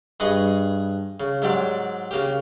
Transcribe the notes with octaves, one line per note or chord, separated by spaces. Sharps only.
G2 G#4 B4 D#5 C#6 D#6
C#3
G#2 F#3 G4 D5 C6
C#3 A#3 G4